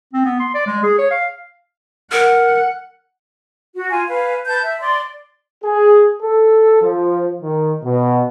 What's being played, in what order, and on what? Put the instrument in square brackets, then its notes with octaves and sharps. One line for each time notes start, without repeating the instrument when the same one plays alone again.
[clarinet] C4
B3
C6
D5
G#3
G#4
C#5
F5
[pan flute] A#4 [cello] F#5
[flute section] F#4
F4 G#5
B4 F5 G#5
B4 A5 G6
E5
D5 C6
[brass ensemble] G#4
A4
F3
D#3
B2